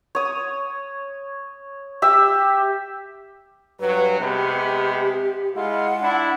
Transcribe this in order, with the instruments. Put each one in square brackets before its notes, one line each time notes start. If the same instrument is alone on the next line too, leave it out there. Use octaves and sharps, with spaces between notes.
[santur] C#5 D#6
G4 E5 E6
[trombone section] G2 F#3 [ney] B4
[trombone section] C3 G#3 B3 [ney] G4
[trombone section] G#3 E4 F4 [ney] F#5
[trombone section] D4 E4